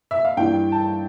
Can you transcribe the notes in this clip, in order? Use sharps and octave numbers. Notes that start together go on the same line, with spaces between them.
E5
F5
G2 E3 G3 G5
A5